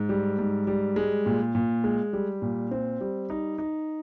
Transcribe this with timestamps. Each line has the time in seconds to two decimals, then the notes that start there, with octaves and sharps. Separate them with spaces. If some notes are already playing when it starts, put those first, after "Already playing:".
Already playing: G#2
0.09 G3
0.39 G#2
0.67 G3
0.96 G#3
1.26 A#2
1.55 A#2
1.84 G#3
2.13 G3
2.42 A#2
2.71 C4
3.01 G3
3.30 D#4
3.58 D#4